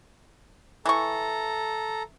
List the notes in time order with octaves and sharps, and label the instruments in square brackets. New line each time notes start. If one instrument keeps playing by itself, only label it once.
[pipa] E3 C#6 [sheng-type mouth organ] A4 A#5